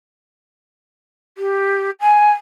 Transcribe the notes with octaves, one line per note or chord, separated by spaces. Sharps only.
G4
G#5